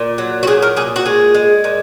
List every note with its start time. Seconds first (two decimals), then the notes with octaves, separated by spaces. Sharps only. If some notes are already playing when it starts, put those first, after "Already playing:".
Already playing: A#2
0.18 F#3
0.43 F#4
0.47 A#2 G#4
0.62 A#4
0.76 A#2 G#4
0.96 F#4
1.06 G#3 G#4
1.34 G#3
1.64 A#2